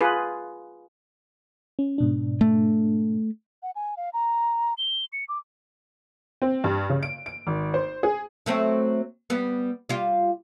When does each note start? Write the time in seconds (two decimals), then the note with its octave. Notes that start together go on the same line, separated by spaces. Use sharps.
0.01 F4 G#4 B4
1.79 C#4
1.98 G#2 B2 D4
2.41 A3
3.63 F#5
3.76 G#5
3.97 F5
4.13 A#5
4.78 G7
5.13 C#7
5.29 D6
6.42 C4
6.64 G2
6.90 C#3
7.03 D7
7.26 D7
7.47 G#1
7.74 C5
8.03 G#4
8.46 F#3 A3 C4
9.30 G3 B3
9.89 G3 F4